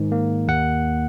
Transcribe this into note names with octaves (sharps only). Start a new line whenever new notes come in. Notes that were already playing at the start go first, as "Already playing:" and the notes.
Already playing: G#2 D#3
A#3
D#2 F#5